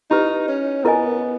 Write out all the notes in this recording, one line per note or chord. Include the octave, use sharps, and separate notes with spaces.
D#4 E4 G4 B4
C#4
B3 E4 A#4 D#5 G#5